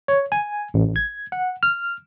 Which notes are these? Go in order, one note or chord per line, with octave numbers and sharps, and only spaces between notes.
C#5
G#5
A1
G#6
F#5
F6